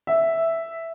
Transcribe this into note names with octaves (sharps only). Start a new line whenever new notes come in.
E5